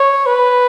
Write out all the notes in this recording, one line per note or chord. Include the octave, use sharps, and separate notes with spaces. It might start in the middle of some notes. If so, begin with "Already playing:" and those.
Already playing: C#5
B4